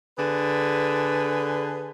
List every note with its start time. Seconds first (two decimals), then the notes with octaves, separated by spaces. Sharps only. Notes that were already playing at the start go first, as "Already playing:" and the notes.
0.18 D3 G#4 B4